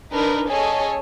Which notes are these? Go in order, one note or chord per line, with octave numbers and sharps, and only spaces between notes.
D4 D#4 A#4 B4
C#4 G#4 A4 C#5 D#5 G#5